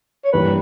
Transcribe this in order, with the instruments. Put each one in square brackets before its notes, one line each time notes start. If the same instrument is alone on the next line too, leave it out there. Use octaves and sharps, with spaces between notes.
[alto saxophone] C#5
[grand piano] G2 E3 G3 A#3 [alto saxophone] B4